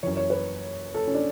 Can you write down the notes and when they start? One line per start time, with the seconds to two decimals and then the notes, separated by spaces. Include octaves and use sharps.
0.03 F#2 E3 C#5
0.17 C#5
0.30 B4
0.95 A4
1.07 C#4
1.14 D4